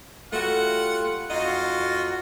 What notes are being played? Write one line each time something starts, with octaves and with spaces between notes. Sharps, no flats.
G3 A3 F4 F#4 F#5
F2 D#4 F4 F#4 F#5